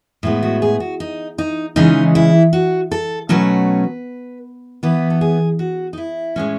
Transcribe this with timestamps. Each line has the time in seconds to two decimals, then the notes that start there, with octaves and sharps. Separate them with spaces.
0.23 A2 G#3 B3
0.43 F#4
0.62 G#4
0.80 F#4
1.00 D#4
1.38 D#4
1.76 C#3 E3 G#3 C#4 D#4
2.15 E4
2.53 F#4
2.91 A4
3.29 B2 F#3 A3 C#4 B4
4.83 E3 B3 B4
5.10 A4
5.21 G#4
5.59 F#4
5.93 D#4
5.98 E4
6.36 A2 G#3 C#4